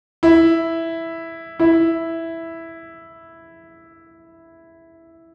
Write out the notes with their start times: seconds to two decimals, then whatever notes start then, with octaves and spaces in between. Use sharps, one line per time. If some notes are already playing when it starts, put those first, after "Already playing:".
0.23 E4
1.59 E4